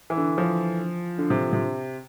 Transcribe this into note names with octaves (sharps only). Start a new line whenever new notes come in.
E3
D3
F3
D3
C3
C3